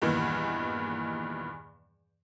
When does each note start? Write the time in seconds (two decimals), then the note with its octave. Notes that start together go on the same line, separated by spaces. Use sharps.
0.02 E2 G2 A#2 D#3 E3